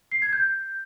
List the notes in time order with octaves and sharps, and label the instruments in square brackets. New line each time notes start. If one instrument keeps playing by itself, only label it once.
[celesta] C7
G#6
G6